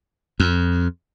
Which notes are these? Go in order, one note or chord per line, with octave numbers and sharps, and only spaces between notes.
F2